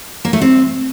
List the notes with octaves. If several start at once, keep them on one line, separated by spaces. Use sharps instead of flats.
A#3
A3
C4